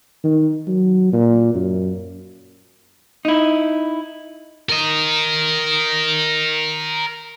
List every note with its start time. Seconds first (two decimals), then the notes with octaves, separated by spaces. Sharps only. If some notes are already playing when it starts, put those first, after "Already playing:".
0.24 D#3
0.67 F#3
1.13 A#2
1.54 F#2
3.25 D#4 E4
4.70 A#4 D#5